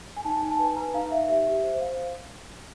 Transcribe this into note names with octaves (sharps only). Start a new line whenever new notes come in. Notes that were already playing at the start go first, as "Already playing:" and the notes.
G#5
D#4 A5
D#4 G#5
A5
B4 G#5
B4 A#5
D#4 F5
D#4 E5
G4 E5
G4
C5
C5 F5